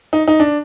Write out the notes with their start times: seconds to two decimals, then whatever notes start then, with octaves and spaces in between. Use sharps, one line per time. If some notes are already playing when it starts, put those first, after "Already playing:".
0.13 D#4
0.28 D#4
0.40 D4